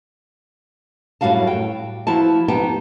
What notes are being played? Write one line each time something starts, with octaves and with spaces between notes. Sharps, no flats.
F#2 A2 G3 F#4 F5 A5
G5
F3 E4 F#4 A5
B3 D#4 G4 G5 A5